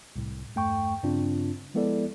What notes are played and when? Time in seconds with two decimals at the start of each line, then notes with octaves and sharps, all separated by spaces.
0.16 C2 A2
0.54 E2 G2 A3 G5 C#6
1.03 G2 C#3 C4 D4 F4
1.74 F3 G#3 B3 E4 A4 D5